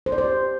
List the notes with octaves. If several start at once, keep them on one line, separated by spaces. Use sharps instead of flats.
C5
D5
C5
G4